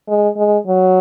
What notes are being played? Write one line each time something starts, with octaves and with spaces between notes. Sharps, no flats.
G#3
G#3
F#3